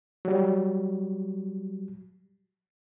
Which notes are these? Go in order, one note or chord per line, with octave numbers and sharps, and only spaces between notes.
F#3 G3